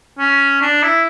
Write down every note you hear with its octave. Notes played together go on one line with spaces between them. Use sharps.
C#4
D4
E4